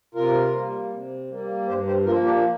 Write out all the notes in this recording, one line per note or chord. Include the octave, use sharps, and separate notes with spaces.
C3 F4 A#4
G3 A#3
C3
G3 A#3
G2 G4 C5
G4 C5
F3 A#3 F4 A#4
D4 G4